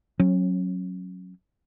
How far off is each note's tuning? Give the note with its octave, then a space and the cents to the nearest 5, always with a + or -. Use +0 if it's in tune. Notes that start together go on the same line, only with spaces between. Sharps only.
F#3 -10 C#4 -30